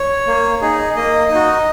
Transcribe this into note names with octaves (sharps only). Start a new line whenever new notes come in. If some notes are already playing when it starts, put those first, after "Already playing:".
Already playing: C#5
A#3
D#4 G#4
A#3 D#5
D#4 F#4